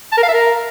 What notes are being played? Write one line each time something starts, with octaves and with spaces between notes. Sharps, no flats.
A5
A#4
F5
E5
A#4